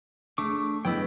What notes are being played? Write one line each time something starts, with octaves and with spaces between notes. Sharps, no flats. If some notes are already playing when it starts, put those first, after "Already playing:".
A3 D4 C#6 D6
F#3 B3 E4 D#5 G5